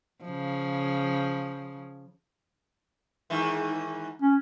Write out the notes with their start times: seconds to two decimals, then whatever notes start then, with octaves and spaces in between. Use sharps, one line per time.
0.24 C#3 F3
3.30 G#2 D#3 E3
4.22 C#4